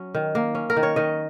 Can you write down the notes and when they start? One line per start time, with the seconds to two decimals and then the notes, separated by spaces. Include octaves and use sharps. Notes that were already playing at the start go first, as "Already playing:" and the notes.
Already playing: F#3 C#4
0.15 D#3
0.35 A#3
0.55 C#4
0.70 A#4
0.77 D#3
0.83 C#5
0.96 D#3 D#5